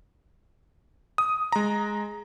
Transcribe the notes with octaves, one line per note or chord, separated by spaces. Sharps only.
D#6
G#3 A#5